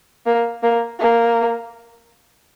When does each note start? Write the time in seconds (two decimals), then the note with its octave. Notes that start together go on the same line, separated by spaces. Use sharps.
0.26 A#3
0.63 A#3
1.00 A#3